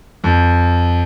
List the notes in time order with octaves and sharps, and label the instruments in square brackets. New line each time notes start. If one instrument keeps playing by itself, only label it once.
[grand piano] F2